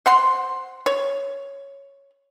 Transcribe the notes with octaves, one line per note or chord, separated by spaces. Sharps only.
C5 F#5 C6
C#5